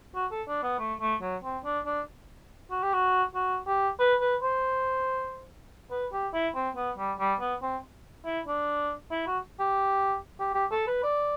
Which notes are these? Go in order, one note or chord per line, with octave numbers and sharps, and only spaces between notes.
F#4
A4
D4
B3
A3
A3
F#3
C4
D4
D4
F#4
G4
F#4
F#4
G4
B4
B4
C5
B4
G4
E4
C4
B3
G3
G3
B3
C4
E4
D4
E4
F#4
G4
G4
G4
A4
B4
D5